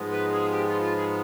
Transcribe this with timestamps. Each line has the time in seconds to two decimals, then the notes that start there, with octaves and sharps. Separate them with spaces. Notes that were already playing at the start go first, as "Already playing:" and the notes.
Already playing: G#2 F3 G#3 B3
0.12 B4
0.33 G#4
0.52 G4
0.67 F4
0.82 F4
0.97 G#4